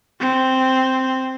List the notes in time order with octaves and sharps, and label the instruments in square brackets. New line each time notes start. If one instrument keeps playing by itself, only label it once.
[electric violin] C4